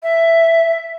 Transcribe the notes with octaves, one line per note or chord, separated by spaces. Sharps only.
E5